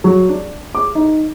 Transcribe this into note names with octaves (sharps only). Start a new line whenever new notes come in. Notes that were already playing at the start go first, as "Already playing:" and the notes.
F#3
D4
D6
D#4